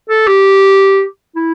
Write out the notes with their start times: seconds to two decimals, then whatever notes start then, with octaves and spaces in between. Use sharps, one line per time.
0.10 A4
0.27 G4
1.36 E4